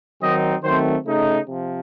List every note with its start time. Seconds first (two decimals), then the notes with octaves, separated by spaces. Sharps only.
0.22 D#3 F#3 C4 D#4 D#5
0.64 D#3 F#3 A3 C4 C5
1.06 C#3 A3 D#4
1.48 C3 F3